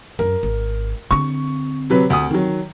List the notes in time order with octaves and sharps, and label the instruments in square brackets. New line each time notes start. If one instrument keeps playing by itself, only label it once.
[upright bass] F#2 [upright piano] A#4
[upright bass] G#1
[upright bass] D3 C4 [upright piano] C#6
[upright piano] C3 F#3 B4
D2 D#6
D#3 F#3